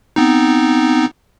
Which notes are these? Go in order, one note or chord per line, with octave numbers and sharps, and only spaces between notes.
B3 C4 D#4